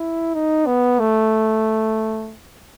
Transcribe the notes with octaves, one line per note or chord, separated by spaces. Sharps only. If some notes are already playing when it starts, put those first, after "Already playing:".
Already playing: E4
D#4
B3
A3